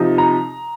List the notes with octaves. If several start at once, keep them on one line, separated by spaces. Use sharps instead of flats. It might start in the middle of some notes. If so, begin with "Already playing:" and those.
Already playing: C3 F3 D#4
A#5